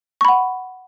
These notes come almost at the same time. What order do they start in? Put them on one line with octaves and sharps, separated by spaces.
C#6 B5 F#5